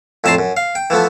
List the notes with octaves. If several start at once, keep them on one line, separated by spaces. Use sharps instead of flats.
F2 A2 E5 A5 A#5 C6
F#2
F5
G5
E3 F3 A3 B3